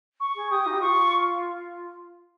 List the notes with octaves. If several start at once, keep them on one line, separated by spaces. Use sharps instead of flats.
C#6
G#4
G4 D#6
D#4
G4
F4 C#6